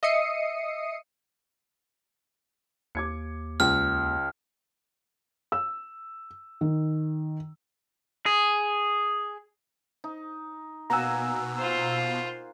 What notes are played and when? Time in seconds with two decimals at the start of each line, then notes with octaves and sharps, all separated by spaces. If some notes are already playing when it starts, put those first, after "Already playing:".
0.03 D#5 E5 D#6 C7 C#7 D#7
2.95 D#2 D6 G#6 C#7
3.60 C#2 F6
5.52 E6
6.61 D#3
8.26 G#4
10.04 D#4
10.90 B2 A#3 F#5 G#5 A#5 E6
11.58 F4 C5